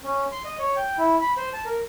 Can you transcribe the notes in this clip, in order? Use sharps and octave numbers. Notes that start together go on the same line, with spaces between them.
C#4
C6
D#5
C#5
G5
E4
B5
C5
A5
A#4